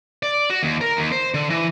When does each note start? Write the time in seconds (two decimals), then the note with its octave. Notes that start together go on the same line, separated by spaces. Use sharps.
0.23 D5
0.50 F#4
0.63 D#2
0.81 A#4
0.97 D#2
1.12 C5
1.34 D3
1.50 E3